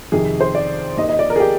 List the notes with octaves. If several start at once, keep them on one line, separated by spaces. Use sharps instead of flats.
F2 C3 D#3 G#4
C5
D5
D#2 D#3 D#5
D#5
D5
A#4
G#4
G4